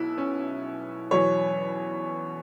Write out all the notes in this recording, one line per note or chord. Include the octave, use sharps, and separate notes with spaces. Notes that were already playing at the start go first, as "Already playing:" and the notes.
Already playing: B1 B2 E4
C#4
E2 B2 F#3 C#5